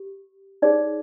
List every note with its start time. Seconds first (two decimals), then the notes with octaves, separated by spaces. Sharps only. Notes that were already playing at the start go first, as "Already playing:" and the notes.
Already playing: G4
0.62 D#4 G#4 C#5 D5